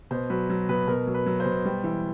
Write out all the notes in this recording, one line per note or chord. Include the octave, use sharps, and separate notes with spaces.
B2 C5
F#3 B4
F#3
B2 B4
B2 A#4
F#3
B4
F#3
C5
B2
G3
E3